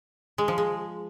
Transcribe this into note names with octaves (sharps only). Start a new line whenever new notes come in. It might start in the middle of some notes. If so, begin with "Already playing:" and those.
G#3
F3
G#3